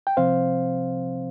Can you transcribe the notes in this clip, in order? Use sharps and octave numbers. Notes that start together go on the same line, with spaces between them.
G5
C2 C3 F3 C4 C5 F5